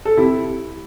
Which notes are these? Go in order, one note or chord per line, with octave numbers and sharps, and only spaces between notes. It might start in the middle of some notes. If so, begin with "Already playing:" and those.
A4
C3 E4 G4